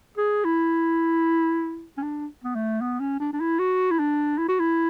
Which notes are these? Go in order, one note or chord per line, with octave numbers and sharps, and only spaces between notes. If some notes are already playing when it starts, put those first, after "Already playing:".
G#4
E4
C#4
D4
B3
A3
B3
C#4
D4
D4
E4
F#4
E4
D4
E4
F#4
E4